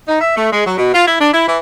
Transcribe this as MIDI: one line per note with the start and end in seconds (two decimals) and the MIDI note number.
0.08 0.17 63
0.21 0.35 76
0.36 0.47 57
0.52 0.65 56
0.66 0.75 54
0.78 0.91 47
0.94 1.05 65
1.06 1.16 64
1.19 1.29 62
1.33 1.47 64
1.47 1.57 52